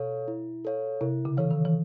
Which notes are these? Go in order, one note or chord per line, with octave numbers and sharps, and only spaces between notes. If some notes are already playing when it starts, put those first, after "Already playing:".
Already playing: B2 A4 C#5 F5
E4
A4 C#5 F5
C3 E4
C#3
E3 A4 C#5 F5
D#3
E3